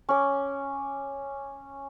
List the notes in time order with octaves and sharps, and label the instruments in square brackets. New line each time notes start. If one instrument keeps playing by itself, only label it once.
[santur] C#4 D6